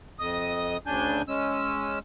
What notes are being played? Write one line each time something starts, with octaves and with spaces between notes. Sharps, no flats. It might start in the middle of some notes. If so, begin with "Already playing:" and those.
F2 D#5 D#6
D2 C#3 D4 G#5 G6
G#3 C#4 E6